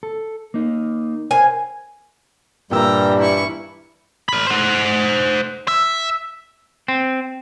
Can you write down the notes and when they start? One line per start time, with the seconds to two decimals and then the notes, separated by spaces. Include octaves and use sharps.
0.03 A4
0.54 A#3 D#4
1.31 A#4 C5 G#5
2.71 G2 A#2 E3 G3 G5 A#5 E6
3.19 E4 C#6
4.29 A#4 B5
4.47 C5 F#5
5.68 E5
6.88 C4